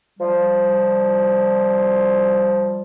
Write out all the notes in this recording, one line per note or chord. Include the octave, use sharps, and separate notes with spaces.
F3 G3